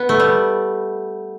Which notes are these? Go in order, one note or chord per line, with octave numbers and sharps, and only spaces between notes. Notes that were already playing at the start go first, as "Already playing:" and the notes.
Already playing: B3
A3
G3